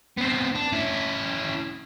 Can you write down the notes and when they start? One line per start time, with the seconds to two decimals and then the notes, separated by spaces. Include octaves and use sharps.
0.18 B3 C4
0.55 D4
0.72 C#4 E4